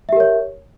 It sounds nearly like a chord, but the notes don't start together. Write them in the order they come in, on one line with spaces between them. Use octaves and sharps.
E5 G4 A#4 C#5